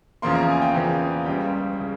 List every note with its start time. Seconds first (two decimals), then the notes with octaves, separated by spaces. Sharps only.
0.22 E2 C#3 F3 A#3 C6
0.35 A#5
0.49 G#5
0.62 G5
0.75 E2 C#3 F3 A#3
1.26 C#2 C#3 G3 G5
1.80 C#3